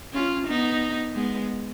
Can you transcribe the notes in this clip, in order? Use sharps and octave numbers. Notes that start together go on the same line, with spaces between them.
C#4 F4
B3 D#4
G#3 B3